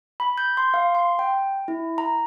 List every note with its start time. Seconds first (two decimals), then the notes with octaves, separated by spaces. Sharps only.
0.20 B5
0.38 G6
0.57 C6
0.74 F5
0.95 C6
1.19 G5
1.68 E4
1.98 A#5